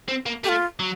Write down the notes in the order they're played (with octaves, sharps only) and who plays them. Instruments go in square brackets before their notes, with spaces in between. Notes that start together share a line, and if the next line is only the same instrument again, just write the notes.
[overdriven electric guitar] C4
A#3
[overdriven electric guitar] A3 [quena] G4
[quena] F4
[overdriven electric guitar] F#3